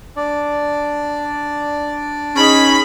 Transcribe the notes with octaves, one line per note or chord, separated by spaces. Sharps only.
D4 D5
C#4 D#4 G#4 D#5 B5